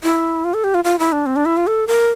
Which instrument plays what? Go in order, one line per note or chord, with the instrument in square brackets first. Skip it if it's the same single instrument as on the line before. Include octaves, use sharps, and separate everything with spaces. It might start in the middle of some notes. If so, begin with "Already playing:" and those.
[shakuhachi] E4
F4
A4
G4
F4
F4
E4
D4
C4
D4
E4
F4
A4
A#4